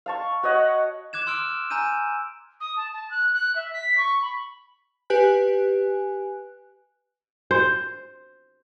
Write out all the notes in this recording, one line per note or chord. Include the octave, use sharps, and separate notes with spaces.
F5 A5 C#6
F#4 C#5 D#5 F#5
D6 F#6 G#6 E7
C6 E6 F6 D7
G#5 A#5 E6 G6 D#7
D#6
A5
A5
F#6
F#6
E5
B6
C#6
B5
G4 B4 G#5 F#6
C5